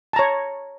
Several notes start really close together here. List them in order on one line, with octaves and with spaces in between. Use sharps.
A5 A#5 C#5